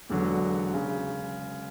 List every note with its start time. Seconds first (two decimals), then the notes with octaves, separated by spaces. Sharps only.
0.09 E1 E2 D3 F#3
0.74 C#3